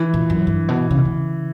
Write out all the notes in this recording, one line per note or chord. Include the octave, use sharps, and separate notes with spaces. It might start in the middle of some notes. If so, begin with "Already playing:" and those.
Already playing: E3
A#2
F#2
G2
B2
C#3
B2
C#3